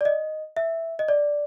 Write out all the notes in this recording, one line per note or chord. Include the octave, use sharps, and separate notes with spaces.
D5
D#5
E5
D#5
D5